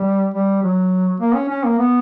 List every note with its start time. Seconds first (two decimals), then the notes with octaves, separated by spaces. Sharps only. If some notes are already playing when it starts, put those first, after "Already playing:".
Already playing: G3
0.34 G3
0.63 F#3
1.20 A#3
1.35 C#4
1.49 C#4
1.64 A#3
1.78 B3